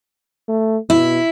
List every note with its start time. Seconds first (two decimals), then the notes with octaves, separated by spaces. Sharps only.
0.48 A3
0.90 B2 E4